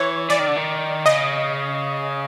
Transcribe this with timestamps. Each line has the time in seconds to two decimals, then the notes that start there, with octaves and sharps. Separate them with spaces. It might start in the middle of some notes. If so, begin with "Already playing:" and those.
Already playing: E3 C#5
0.30 E3 D5
0.39 D#3
0.47 D3
0.56 D#3
1.06 C#3 D#5